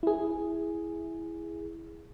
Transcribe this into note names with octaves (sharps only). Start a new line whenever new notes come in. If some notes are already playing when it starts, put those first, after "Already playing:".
E4 G#4